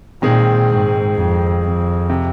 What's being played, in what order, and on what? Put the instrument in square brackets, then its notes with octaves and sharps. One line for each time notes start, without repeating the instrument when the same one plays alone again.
[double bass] A#2 [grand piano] D#3 G#3 C4 G#4
[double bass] G#2
F2
F2
[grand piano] C3